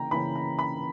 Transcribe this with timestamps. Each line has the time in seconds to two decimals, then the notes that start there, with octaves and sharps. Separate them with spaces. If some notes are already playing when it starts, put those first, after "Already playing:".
Already playing: C#3 E3 A#3 G5 A#5
0.11 C#3 E3 A#3 C#4 B5
0.36 A#5
0.59 B5